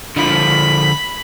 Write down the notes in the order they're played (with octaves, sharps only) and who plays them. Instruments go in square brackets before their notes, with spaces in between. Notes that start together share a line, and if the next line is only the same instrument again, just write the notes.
[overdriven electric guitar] D3 F3 [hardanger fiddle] B5